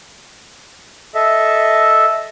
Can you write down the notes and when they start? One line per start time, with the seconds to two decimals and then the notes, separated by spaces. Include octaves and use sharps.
1.15 A4 D#5 E5